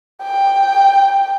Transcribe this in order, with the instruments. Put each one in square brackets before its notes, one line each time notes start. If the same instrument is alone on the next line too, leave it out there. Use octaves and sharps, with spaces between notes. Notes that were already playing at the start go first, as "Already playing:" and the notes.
[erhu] G5